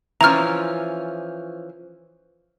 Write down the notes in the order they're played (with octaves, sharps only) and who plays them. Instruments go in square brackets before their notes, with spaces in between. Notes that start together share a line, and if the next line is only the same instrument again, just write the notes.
[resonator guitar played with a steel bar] E3 F3 C#4 [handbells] A#5 F6